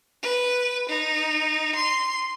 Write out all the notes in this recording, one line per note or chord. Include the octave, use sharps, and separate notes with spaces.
B4
D#4
C6